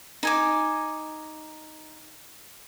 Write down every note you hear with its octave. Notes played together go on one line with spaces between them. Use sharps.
D#4 G#5 D6